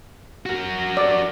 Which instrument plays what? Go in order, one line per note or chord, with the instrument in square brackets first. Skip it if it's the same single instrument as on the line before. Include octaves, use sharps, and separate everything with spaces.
[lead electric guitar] F#4 A#4
[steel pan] D5